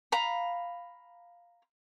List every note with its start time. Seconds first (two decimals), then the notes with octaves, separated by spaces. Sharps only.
0.12 F5 A#5 B5